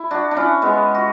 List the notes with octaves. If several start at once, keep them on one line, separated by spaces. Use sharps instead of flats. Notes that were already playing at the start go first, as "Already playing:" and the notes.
Already playing: E4
D4 F#4
D4
C#4 E4
G#3 B3
F#4